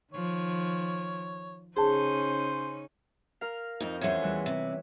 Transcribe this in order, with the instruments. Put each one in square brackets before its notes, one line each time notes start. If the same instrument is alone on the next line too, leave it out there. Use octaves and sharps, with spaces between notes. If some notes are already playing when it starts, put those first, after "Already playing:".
[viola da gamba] D#3 F3 [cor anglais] C#5
[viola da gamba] C#3 C#4 D#4 [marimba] G#4 A5 [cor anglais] C5
[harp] A#4 F5
[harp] F2 C4 [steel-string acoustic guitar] D#4
[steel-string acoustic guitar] E2 G#3 [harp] C#4 C5 C#5
[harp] E3 G3 B4
[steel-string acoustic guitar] C3